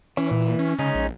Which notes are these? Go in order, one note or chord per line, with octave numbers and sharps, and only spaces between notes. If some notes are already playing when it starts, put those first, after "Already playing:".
E3 C#4
A#2
C#4
C#3 G#3 C#4 D#4
A#1